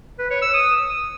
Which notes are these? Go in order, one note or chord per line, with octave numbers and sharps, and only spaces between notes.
B4
C#5
E6
D#6